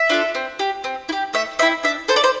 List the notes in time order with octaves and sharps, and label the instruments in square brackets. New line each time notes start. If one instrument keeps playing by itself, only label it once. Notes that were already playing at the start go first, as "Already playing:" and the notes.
Already playing: [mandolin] E5
D4 F4 A4
C4
G4
C4
E4
G4
A3 E5
C4 E5
E4
D4 E5
A4 C5
D5
C5